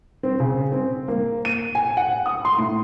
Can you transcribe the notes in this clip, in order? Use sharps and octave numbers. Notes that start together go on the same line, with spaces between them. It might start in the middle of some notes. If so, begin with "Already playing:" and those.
C4
C#3
C4
A#3
D#7
G#5
F#5
D#6
C6
A2